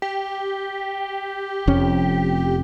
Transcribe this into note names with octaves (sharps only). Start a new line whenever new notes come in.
G4
F1 F2 C#4